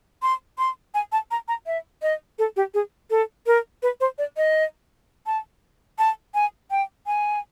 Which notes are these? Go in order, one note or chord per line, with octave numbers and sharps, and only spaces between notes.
C6
C6
G#5
A5
A#5
A#5
E5
D#5
A4
G4
G#4
A4
A#4
B4
C5
D5
D#5
A5
A5
G#5
G5
G#5